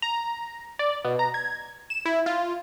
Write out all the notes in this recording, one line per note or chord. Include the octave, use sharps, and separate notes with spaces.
A#5
D5
B2
A#5
G#6
E7
E4
F4